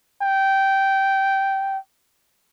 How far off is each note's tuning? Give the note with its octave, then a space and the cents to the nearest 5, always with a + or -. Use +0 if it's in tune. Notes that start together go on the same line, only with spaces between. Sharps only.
G5 -15